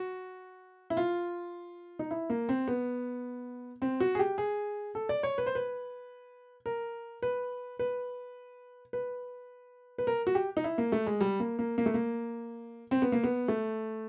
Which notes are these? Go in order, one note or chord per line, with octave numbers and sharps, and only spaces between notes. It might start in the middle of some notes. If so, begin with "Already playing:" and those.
Already playing: F#4
E4
F4
D#4
E4
A#3
C4
B3
C4
F#4
G#4
G4
G#4
A4
D5
C#5
B4
C5
B4
A#4
B4
B4
B4
B4
A#4
F#4
G4
D#4
E4
A#3
A3
G#3
G3
A#3
A#3
A#3
A3
A#3
C4
B3
A#3
B3
A3